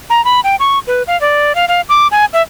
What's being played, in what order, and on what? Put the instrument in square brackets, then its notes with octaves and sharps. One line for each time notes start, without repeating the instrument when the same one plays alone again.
[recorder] A#5
B5
G5
C#6
B4
F5
D5
F5
F5
D6
G#5
E5